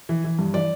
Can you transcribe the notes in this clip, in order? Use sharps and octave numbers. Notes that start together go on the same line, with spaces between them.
E3
E3
G2
E3 D5